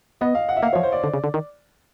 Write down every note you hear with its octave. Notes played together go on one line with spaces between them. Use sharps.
B3 D#5
F5
F#5
E5
A#3 F5
F3 C#5
C5
D5
D3
C#3
D3
D#3